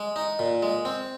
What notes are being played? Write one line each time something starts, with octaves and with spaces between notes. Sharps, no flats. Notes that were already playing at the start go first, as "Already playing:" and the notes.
Already playing: G#3
D#4
A#2
G#3
C4